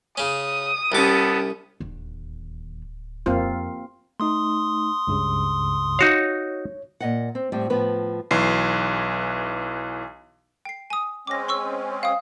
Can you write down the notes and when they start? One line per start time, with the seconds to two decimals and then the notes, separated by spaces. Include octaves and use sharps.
0.18 C#3 C#4 D#6
0.92 C2 B3 C#4 G4 A4 D6
1.80 D1 D#2 D4
3.26 F2 A#3 C4 F4
4.20 A3 D#4 C6 D#6
5.07 C#2 G2 C#3
5.99 D#4 F#4 C#5 F5
7.00 A#2 D#5 F#5
7.35 C4
7.52 A2 G3 C4
7.70 A2 F3 B3 B4
8.31 B1 E3 C7
10.65 G5 C7
10.90 G#5 D#6
11.27 G#3 C4 C#4 D6 A#6
11.48 C6 C#6 E6
12.03 F5 G5 D#6